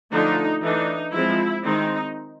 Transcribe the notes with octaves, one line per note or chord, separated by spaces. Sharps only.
D3 F3 A3 D4 D#4
E3 A3 D4 D#4
F3 G#3 C4 E4
D#3 G#3 C4 D#4